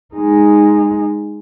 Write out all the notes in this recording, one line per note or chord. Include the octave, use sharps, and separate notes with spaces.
G#3 D#4